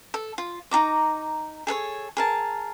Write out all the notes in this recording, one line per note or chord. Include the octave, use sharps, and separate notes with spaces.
A4
F4
D#4 F#4 A#5 D6
G#4 A4 B4 C#5
G#4 A#4 A5